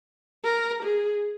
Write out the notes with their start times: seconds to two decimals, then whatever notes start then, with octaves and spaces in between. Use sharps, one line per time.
0.44 A#4
0.82 G#4